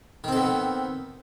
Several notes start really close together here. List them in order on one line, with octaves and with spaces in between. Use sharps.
D#3 C4 A4 B3